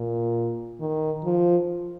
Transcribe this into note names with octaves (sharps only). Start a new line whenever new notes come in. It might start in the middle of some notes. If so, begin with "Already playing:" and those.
Already playing: A#2
D#3
F3